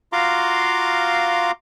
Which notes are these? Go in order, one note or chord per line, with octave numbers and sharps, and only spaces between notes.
F4 F#4 F5 A#5 C6 D6